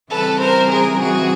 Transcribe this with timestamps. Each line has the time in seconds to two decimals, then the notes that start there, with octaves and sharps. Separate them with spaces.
0.11 C#3 E3 G3 C4 A4 B4
0.40 A#4 C5
0.71 G#4 A#4
1.01 F#4 G#4